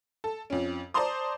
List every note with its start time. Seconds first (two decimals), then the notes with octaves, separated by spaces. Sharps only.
0.24 A4
0.50 F2 C#4
0.94 C5 D5 A5 A#5 C6 D#6